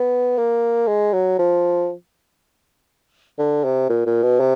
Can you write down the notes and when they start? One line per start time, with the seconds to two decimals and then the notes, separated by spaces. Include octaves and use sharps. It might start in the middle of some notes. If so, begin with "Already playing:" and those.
Already playing: B3
0.38 A#3
0.88 G#3
1.13 F#3
1.39 F3
3.39 D3
3.64 C3
3.89 A#2
4.06 A#2
4.23 B2
4.40 C3